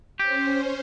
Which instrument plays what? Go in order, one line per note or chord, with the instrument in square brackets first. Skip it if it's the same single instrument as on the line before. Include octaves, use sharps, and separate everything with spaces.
[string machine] C#4 C5 [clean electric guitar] G4